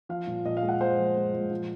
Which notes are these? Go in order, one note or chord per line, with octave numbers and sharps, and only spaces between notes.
F3 F5
A#2
A#2 D#5
F5
G#3
F#5
G#3 C5
F3
G#3
A#2
F3